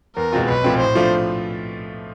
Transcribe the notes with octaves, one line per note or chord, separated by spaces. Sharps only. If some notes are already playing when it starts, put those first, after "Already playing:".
E2 A#4
B2 G#3 C4 F4
B1 B4
A#2 F3 A3 C4
A2 C5
F3 A3 D4 F4